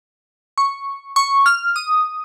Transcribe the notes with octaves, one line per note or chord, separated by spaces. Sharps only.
C#6
C#6
F6
D#6